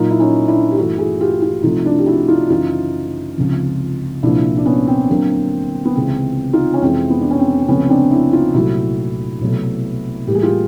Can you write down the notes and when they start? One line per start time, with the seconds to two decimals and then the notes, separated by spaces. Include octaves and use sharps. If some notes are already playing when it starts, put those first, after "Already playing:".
Already playing: A#2 F#3 A#3 D#4 F4
0.11 E4
0.20 C#4 D#4
0.48 D4 E4
0.71 G4
0.77 G2 E3 A3 E4 F#4
0.98 F#4 G#4
1.20 F4 G4
1.42 F4 G4
1.63 C2 C3 F3 A3 D#4 F4
1.85 D4 E4
1.99 G4
2.06 E4 F#4
2.28 D#4 F4
2.50 F#2 C#3 E3 D#4 F4
3.36 C#2 C3 F3
4.23 C2 A#2 F3 A#3 D4 E4
4.57 D4
4.66 B3 C#4
4.87 C4
5.09 D2 D3 F#3 A#3
5.85 B3
5.95 C#2 C3 E3 G#3 C4
6.53 D#4 F4
6.74 C#4
6.81 F2 C3 E3 G#3 C4
7.10 B3
7.21 D4
7.31 C#4
7.39 C4
7.59 C4
7.68 C#2 C3 F3 A3 B3 C#4
7.89 C4 D4
8.11 D4 E4
8.33 D#4 F4
8.54 C2 A#2 F#3 A3 E4 F#4
9.41 C2 B2 F#3 A3
10.27 A2 E3 G3 A#3 G4
10.35 G#4
10.43 F4 G4